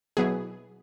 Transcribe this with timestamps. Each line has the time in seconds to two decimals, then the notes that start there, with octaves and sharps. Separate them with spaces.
0.17 B2 F#3 B3 E4 G#4